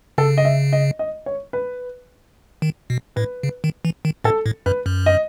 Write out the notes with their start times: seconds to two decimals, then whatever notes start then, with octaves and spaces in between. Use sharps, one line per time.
0.18 C#3 A4
0.38 D#5
0.45 E5
0.73 D#5
0.99 D#5
1.26 C#5
1.53 B4
2.62 D#3
2.90 B2
3.16 A2 B4
3.43 C#3
3.64 D#3
3.85 E3
4.05 D#3
4.24 A2 A4
4.46 A2
4.66 F#2 B4
4.86 F#2
5.06 D#5